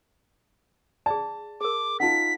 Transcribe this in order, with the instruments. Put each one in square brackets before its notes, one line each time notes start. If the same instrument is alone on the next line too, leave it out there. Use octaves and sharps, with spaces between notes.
[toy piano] G#4 D5 [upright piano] A5
[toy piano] G#4 A#4 [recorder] D6
[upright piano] D#4 F4 [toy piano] F#5 A5 [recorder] B6